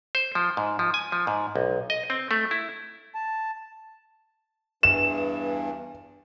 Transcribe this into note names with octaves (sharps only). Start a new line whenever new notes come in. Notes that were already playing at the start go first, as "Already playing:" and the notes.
C5
F3
G#2
F3
G#5
F3
G#2
B1
D#5
C4
A3
E4
A5
E2 G2 E3 E7